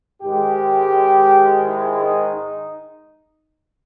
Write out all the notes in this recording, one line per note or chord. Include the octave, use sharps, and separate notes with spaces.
G#2 D#3 G#3 G4
E4
D#4
D#4